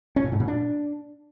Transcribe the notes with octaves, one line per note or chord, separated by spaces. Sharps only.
C#4
A#2
G#2
A#2
D4